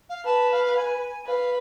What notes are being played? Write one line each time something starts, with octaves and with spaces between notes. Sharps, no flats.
F5
B4 A5
F5
G#5
B4 F5